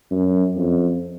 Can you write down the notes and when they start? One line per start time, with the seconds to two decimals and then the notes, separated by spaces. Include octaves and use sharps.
0.11 F#2
0.56 F2